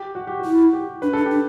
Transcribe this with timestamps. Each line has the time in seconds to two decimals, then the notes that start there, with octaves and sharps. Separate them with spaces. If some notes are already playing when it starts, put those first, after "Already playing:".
Already playing: G4
0.15 F#4
0.27 G4
0.40 F#4
0.45 E4
0.73 G4
1.02 D4 B4
1.13 D4 A4
1.25 G4
1.31 D4